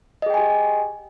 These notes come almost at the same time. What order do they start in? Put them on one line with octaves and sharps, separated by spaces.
D#5 G#4 G5 G#5 G4